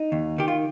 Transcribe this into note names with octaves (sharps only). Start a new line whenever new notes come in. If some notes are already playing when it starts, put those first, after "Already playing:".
Already playing: D#4
D#2
D#3 G4
F4